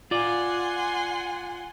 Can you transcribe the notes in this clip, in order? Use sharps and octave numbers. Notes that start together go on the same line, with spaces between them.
F4 D5 F#5 G#5 C6